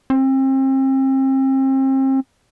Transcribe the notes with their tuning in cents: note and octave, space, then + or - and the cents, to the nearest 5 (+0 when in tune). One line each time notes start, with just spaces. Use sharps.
C4 +35